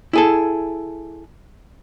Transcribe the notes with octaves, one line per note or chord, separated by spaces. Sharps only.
E4 G#4 A4